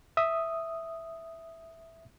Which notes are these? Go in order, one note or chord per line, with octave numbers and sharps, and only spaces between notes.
E5 D#6